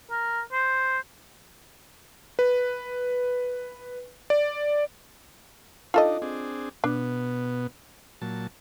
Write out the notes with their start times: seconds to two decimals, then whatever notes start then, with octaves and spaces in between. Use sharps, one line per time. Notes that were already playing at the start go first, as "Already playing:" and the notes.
0.11 A#4
0.52 C5
2.39 B4
4.30 D5
5.94 D4 D#4 F4 A4 D#5
6.22 C4 D4 G#4
6.84 B2 B3 D4
8.22 A#2 F#3 A5